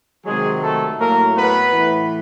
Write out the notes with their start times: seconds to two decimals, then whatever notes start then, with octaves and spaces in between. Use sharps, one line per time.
0.25 C3 D#3 F#3 G#3 G#4
0.62 A3 A4
0.99 A2 F#3 A#3 A#4
1.36 B3 B4
1.73 A2 E3